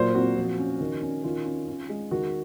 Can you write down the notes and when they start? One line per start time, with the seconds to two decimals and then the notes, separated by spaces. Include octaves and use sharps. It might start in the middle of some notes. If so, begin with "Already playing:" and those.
Already playing: A#2 F#3 C5
0.15 C4 F#4
0.36 F3
0.58 C#4
0.81 D#3
1.02 C#4
1.24 D#3 F4
1.45 C#4
1.67 C#4
1.89 G#3
2.11 D#3 F#4